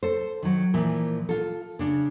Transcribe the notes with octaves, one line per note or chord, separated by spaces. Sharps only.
A4 C5
D#3 F#3
A#2 E3 F3
F4 A4
C#3 D4